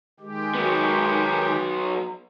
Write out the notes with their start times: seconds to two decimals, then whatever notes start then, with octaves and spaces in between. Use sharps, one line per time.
0.20 D#3 G#3 G4
0.55 F#3 B3